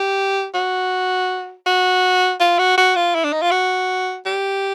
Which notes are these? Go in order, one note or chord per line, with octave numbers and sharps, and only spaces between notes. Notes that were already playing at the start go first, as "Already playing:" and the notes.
Already playing: G4
F#4
F#4
F4
F#4
F#4
F4
E4
D4
D#4
F4
F#4
G4